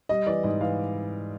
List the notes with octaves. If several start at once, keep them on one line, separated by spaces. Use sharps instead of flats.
G3 D#5
E3 D5
G#2 D#5
E3 F5